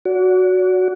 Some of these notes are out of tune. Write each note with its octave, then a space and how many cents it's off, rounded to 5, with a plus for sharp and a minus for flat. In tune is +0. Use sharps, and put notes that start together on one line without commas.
F#4 -5 D5 -45